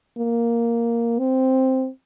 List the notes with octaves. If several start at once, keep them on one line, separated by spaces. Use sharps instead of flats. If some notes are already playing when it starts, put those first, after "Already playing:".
A#3
C4